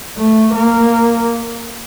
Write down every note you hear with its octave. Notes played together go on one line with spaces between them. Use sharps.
A3
A#3